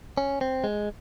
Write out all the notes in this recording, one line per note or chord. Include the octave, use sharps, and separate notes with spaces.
C#4
C4
G#3